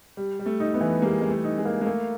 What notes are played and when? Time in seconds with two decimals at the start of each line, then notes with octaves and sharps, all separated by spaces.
0.17 G3
0.39 G3
0.46 A3
0.60 D#4
0.74 A3 B3
0.81 E3
1.02 G3 G#3 A#3
1.21 G3 G#3
1.30 A3
1.44 D#4
1.58 G#3
1.65 A#3
1.81 G#3
1.86 A3 A#3